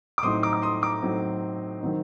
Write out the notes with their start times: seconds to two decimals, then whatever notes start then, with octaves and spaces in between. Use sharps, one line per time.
0.18 D6
0.23 A2 F#3 C4 D#4 C6 D#6
0.43 A#5 D6
0.53 D6
0.62 C6 D#6
0.82 A#5 D6
1.02 A2 F#3 C4 D#4
1.81 D#3 F#3 C4 D#4